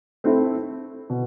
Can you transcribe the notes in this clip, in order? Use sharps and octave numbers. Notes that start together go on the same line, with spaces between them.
A3 C4 E4
B2